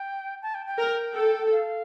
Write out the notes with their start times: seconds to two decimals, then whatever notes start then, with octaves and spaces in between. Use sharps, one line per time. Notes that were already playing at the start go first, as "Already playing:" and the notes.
Already playing: G5
0.42 A5
0.54 G5
0.66 G5
0.78 A#4
1.15 A4
1.52 F5